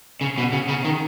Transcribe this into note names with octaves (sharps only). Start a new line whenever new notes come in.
C#3
B2
C#3
C#3
D#3